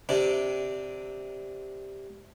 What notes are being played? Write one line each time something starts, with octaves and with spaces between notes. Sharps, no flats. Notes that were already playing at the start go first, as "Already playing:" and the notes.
C3 D4